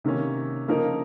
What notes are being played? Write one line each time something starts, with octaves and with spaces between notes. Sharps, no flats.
C3 D#3 A#3 C#4
C#3 F3 A#3 D#4 A#4